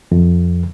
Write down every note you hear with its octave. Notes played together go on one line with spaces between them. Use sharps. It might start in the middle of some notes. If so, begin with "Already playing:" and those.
F2